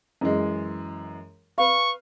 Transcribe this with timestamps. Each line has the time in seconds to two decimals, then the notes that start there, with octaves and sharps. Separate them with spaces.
0.21 F#2 E3 G#3
1.58 B4 F5 C#6